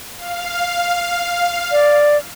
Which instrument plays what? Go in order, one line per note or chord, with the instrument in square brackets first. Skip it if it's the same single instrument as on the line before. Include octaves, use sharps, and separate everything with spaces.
[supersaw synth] F5
[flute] D5